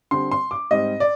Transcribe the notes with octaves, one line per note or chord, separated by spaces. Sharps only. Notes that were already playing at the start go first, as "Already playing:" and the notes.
D3 G3 C4 C6
C6
D6
G#2 G3 C4 D#5
D5